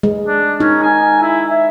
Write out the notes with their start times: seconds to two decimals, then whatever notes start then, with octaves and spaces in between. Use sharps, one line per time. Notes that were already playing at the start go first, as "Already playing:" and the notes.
0.03 G#3
0.27 D4
0.60 C#4 D#4
0.83 G#5
1.21 E4
1.49 E5